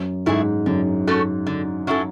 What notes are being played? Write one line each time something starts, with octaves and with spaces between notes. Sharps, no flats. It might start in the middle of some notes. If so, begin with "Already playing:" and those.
Already playing: F#2
G#2 A3 E4 G#4
F#2 D3
A3 C#4 F#4 A4
D3
F#3 C#4 E4 A4